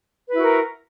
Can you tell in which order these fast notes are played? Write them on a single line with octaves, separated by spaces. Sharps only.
B4 E4 F#4 A#4